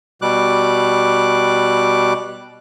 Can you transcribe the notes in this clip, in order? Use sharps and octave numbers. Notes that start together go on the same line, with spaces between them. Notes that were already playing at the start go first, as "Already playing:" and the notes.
B2 G3 D6 F#6